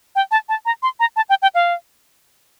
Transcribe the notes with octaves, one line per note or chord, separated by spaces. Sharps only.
G5
A5
A5
A#5
C6
A#5
A5
G5
G5
F5